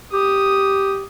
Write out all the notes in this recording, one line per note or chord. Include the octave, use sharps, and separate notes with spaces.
G4 D#6